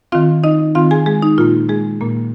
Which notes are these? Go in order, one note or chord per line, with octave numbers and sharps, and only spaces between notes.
D#3 C4 F4 F5
D#4 D#5
D#3 C4 F4 F5
G#4 G#5
G#3 G#4
D#4
A#2 A#3 F4
G#3 G#4
A#2 A#3